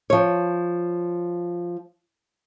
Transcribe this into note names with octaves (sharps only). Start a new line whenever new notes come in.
F3 C#5